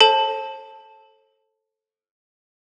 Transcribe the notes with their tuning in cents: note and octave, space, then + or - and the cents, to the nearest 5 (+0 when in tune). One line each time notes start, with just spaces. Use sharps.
A4 +0 C5 +45 A5 +0